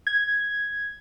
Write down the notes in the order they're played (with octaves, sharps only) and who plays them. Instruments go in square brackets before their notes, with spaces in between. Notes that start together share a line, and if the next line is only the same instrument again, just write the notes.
[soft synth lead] G#6